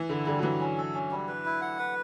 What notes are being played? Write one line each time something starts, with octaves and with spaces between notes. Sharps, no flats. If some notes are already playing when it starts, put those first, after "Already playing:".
Already playing: E3
D3 E4
D3 G3
F#3
E3 G3
C#4
A4
C#4
G3
B4
E4
F#5
B4